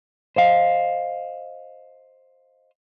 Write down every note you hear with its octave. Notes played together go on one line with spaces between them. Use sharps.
C5 D#5 F5